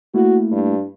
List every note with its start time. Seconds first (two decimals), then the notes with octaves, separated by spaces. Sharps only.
0.14 A3 A#3 E4 F#4
0.52 G2